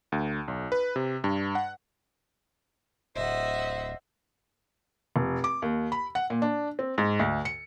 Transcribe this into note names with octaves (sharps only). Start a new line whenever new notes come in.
D2
B1
B4
C3
G2
F#5
D1 C5 D#5 E5 F#5
F1
D6
D#2
B5
F#5
A#2
D4
C4
G#2
D2
C#7